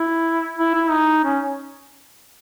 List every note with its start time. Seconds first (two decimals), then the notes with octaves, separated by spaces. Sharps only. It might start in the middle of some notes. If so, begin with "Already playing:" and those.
Already playing: E4
0.58 E4
0.75 E4
0.91 D#4
1.25 C#4